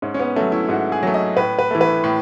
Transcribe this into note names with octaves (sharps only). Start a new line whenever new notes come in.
G#2 C#4
C#4
B3
F#3 A3 C#4
E4
G#2 F#4
G#4
F#3 A3
D#5
A2 B4
B4
E3 A3
B4
A2